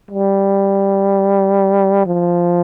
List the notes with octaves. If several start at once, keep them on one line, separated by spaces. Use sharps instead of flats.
G3
F3